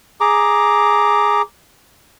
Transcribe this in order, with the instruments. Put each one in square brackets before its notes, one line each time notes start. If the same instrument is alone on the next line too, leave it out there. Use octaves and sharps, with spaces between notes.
[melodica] G#4 A#5 D6